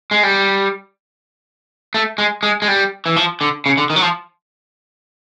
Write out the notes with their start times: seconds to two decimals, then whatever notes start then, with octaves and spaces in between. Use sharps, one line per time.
0.11 G#3
0.23 G3
1.94 A3
2.18 G#3
2.43 G#3
2.62 G#3
2.68 G3
3.06 E3
3.16 F3
3.41 D3
3.66 C#3
3.78 D3
3.90 D#3
3.96 F#3
4.02 F3